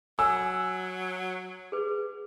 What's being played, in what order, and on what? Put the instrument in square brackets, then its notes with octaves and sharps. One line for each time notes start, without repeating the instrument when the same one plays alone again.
[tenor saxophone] F#3 [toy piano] G#5 [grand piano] E6
[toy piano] G#4 B4